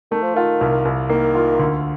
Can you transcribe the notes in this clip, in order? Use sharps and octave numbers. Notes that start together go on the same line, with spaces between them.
D#3 A3
F3
D#3 F4
C2
C2
D#3 A#3
F4
D2